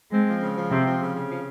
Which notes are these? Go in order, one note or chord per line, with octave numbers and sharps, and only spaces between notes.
G#3 C4
F3
C#3
F3
C3 C4
F3
C#3
C#3
F3